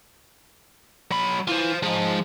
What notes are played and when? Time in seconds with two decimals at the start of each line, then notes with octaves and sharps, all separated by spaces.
1.11 F#3 B5
1.48 E3 F4 C5
1.83 F3 G#3 D#4